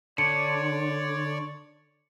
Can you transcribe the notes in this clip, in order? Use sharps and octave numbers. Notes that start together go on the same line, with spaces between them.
D3 C#5 D5 C#7